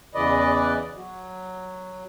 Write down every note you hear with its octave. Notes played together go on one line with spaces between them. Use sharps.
E2 C#3 E3 B4 D5 D#5
F#3